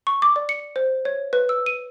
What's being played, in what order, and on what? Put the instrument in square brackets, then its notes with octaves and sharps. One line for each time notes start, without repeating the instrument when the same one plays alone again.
[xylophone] C#6
D6
D5
C#7
C5
C#5
B4
E6
D#7